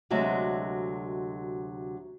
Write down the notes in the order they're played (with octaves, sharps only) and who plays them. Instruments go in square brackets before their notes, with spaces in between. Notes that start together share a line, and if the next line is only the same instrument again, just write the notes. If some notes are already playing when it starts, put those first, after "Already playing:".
[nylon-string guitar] D2 C3 F#3 G#3 E5